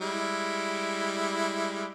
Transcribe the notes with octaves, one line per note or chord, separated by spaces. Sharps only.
G3 G#3 E4